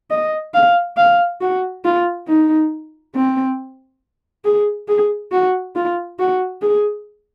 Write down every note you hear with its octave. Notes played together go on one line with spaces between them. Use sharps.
D#5
F5
F5
F#4
F4
D#4
C4
G#4
G#4
F#4
F4
F#4
G#4